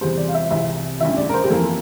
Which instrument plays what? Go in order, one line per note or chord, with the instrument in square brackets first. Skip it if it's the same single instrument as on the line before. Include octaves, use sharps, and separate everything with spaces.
[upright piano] E2 C3 G3 C5
D5
F5
E5
C2 C3 E3 E5
A1 G2 E3 E5
D5
A#4
C5
G4
F2 E3 A#3 A4